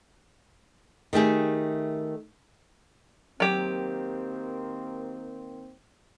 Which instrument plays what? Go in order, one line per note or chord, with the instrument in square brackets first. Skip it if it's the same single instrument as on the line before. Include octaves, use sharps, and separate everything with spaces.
[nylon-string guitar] D#3 A3 G4 G#4
[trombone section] D#3 A#3 C4 [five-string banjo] F#3 G4